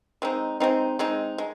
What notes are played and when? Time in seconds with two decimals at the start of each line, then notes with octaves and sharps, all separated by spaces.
0.22 G#3 C4 D#4
0.60 G#3 C4 D#4
0.99 G#3 C4 D#4
1.38 G#3